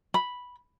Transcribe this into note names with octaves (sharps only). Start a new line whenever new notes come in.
B5